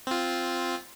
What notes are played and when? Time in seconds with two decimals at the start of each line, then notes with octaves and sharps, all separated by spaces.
0.07 C4 F4